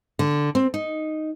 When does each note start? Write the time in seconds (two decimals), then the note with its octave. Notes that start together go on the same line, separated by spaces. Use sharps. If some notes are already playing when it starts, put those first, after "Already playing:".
0.19 D3
0.55 C4
0.74 D#4